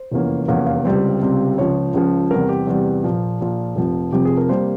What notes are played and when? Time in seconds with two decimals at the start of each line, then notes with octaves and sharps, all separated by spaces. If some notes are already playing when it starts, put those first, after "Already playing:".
Already playing: C5
0.12 F1 E2 E3 A#3 C#4
0.48 F1 E2 E3 A#3 C#4 F5
0.67 F5
0.85 C#2 C3 G3 C4
1.22 C#2 C3 G3 C4
1.58 C#2 C#3 F3 C#5
1.94 C#2 C#3 F3
2.31 E2 C3 G3 A#4
2.49 G4
2.67 E2 C3 G3
3.04 A#1 A#2 F3
3.41 A#1 A#2 F3
3.76 F1 F2 C3 F3
4.13 F1 F2 C3 F3 G4
4.25 G#4
4.37 A#4
4.49 C3 G3 A#3 C5